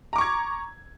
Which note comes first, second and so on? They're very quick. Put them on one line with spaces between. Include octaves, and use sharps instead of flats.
A#5 D6 C#6 G#6